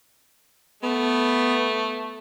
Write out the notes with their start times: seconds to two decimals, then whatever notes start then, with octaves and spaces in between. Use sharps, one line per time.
0.83 A3 B3